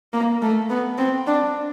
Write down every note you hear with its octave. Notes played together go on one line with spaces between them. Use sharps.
A#3
A3
B3
C4
D4